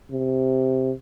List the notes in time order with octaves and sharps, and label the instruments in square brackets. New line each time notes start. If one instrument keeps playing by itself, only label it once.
[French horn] C3